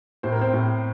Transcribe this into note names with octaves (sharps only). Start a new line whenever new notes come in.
A2 C5
A#4
C4 C5
A2